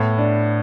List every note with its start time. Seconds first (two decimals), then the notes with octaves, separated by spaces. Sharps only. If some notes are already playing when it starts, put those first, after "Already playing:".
Already playing: A2 B3
0.18 D4